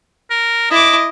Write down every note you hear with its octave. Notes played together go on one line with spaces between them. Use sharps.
A#4
E4 D#5 D6